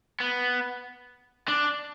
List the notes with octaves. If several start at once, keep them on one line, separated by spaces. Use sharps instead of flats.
B3
D4